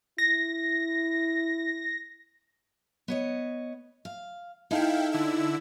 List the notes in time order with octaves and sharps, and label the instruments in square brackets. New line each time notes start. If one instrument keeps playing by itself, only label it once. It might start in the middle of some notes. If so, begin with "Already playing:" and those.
[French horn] E4 [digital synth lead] A#6
[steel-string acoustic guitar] B3 C#5 D#5
F5
[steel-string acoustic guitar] D#4 G#4 A4 [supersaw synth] E4 F5 G5
[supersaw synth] D3 E4 E6